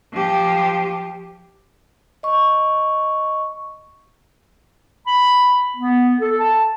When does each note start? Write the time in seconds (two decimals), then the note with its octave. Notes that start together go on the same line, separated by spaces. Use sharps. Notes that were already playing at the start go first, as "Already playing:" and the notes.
0.13 F3 G4
2.23 D#5 C#6
5.06 B5
5.77 B3
6.20 A4
6.39 A5